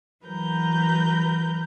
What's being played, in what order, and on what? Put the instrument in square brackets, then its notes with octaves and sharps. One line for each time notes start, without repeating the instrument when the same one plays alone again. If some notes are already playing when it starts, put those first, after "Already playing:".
[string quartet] E3 F#3 A#4 B4 A#5 G6